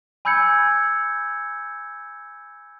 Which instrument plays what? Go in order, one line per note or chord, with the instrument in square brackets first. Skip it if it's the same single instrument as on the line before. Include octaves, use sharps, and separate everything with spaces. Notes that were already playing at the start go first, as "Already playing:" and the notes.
[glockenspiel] G#5 B5 E6 G6 G#6 C#7